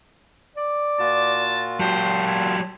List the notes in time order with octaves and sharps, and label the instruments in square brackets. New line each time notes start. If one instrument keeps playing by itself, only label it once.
[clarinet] D5
[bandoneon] A#2 F4 F#4 [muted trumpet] A5
[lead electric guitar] F#3 G4 [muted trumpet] C5 [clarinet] A5
[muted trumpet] E4